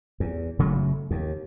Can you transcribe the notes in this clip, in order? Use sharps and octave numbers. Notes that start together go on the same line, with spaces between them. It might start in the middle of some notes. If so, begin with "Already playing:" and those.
E2
F#1 C#3 F#3 A3
D#2